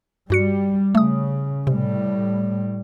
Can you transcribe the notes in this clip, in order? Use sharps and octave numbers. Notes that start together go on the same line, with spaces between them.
G2 G3 F#4 C#7
C#3 A3 D#6
A2 C3 G3